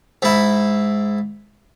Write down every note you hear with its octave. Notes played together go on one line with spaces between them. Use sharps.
G#2 E4